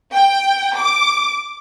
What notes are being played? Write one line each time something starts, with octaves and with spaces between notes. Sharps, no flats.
G5
D6